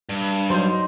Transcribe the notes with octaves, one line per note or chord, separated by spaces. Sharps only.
G2
F#3 D#4 C5 C6